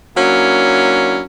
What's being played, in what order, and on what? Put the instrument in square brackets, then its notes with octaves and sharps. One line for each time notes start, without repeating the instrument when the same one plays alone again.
[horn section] F#3 A#3 C#4 D4 E4